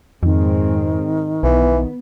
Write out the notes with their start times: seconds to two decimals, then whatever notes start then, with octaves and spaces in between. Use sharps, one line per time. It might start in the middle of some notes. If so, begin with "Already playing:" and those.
0.23 F2 G#2 D#3 G#3 C4
1.43 B1 E3 B3